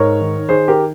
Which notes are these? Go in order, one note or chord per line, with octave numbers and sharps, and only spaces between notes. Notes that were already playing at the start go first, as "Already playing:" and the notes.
Already playing: G#2 A#4 C#5
D#3
D#3 G#4 C5
G4 A#4